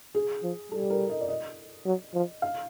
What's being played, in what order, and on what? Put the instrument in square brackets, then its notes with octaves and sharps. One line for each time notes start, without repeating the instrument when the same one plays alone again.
[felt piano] G#4
[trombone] F3
[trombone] G3 [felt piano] A4
[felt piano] A#4
D#5
D5
D#5
[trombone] F#3
F3
[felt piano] F5